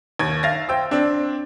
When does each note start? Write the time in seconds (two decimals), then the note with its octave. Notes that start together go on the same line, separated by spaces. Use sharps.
0.19 D#2 G#6
0.43 E5 F5 A6 A#6
0.69 C5 G5 E6
0.91 C4 D4